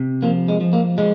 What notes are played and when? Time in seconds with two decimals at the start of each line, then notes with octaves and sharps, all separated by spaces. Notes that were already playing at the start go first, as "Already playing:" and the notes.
Already playing: C3
0.23 F3 A#3
0.48 G#3
0.61 F3
0.73 A#3
0.98 F3 G#3